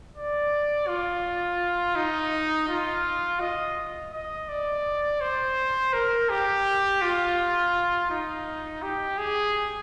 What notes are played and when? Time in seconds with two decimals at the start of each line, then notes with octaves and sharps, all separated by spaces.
0.15 D5
0.87 F4
1.96 D#4
2.69 F4
3.41 D#5
4.12 D#5
4.49 D5
5.21 C5
5.93 A#4
6.30 G4
7.02 F4
8.10 D#4
8.82 G4
9.18 G#4